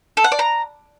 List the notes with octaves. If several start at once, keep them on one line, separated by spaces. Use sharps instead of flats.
A4
F#5
D5
A#5